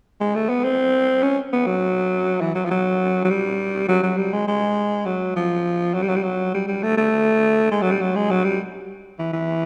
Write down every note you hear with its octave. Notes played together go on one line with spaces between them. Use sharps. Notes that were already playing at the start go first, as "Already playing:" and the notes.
G#3
A3
B3
C4
C#4
B3
F#3
E3
F#3
F3
F#3
F#3
G3
F#3
F#3
G3
G#3
G#3
F#3
F3
F#3
G3
F#3
G3
F#3
G3
G3
A3
A3
G#3
F#3
G3
F#3
G#3
F#3
G3
E3
E3